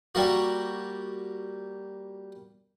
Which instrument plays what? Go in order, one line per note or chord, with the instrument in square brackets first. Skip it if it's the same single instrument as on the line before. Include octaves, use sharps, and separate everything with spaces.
[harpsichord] G3 A#3 F#4